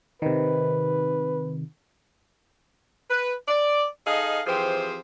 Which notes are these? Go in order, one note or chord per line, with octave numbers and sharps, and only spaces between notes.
C3 D#3 B4
B4
D5
D#4 G#4 A4 D#5 F5
E3 F3 C4 G4 G#4 C5